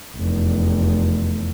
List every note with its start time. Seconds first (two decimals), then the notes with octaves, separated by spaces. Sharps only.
0.17 F1 E2